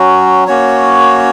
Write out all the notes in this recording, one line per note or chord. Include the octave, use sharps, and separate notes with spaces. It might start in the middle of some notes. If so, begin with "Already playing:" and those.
Already playing: F#3 C#4 F#4
A#3 C#4 F#4 C#5